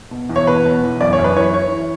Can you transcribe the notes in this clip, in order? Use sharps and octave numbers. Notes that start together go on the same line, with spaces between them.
B2
E2
C#5
B2 B4
B2
E2
F#2 D5
C#5
F#2
B4
E3 C#5
E3 C#5
E3